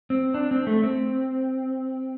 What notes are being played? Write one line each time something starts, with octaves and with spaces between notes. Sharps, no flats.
C4
D4
C4
A3
C4